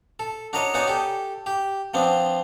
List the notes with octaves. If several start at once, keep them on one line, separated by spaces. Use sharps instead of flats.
A4
D4 F#4 A#4 C#5 D#5
B3 D#4 F#4 C#5 D5 G#5
G4 A4
G4
F3 B3 C4 D4